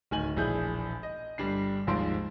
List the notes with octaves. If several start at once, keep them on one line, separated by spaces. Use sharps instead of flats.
D1 D#3 G#5 F#7
E1 A#1 E4 G#4 G6
D#5
G1 G3 D4 C7
G#1 D#2 G#2 F3 C6 D7